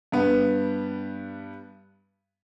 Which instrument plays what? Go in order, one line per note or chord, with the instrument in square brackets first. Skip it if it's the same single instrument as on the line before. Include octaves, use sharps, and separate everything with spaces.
[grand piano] G2 B3